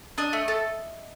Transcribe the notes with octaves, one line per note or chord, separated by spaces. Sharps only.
D4 D#5
A3
A4